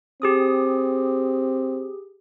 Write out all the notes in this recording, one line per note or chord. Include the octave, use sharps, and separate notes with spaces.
C4 G4 G#4 D#6